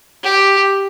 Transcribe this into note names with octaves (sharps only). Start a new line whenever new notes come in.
G4